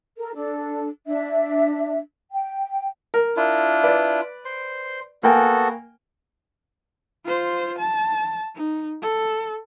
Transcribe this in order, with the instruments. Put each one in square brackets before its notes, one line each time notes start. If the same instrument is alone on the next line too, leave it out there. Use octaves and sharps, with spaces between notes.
[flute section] A4 A#4
D4 A4
D4 E5
G5
[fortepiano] A#4
[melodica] D4 E4 F4
[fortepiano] B4 D5
[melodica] C5 C6
[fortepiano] A#3 G5 G#5 [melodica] B3 F#4 A4
[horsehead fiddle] F4 C5
A5
D#4
A4